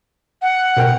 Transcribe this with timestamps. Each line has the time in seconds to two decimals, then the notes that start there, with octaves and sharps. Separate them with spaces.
0.42 F#5
0.76 B2 A#4 G5